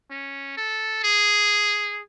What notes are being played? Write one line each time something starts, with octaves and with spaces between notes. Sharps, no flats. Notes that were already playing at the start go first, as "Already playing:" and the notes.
C#4
A4
G#4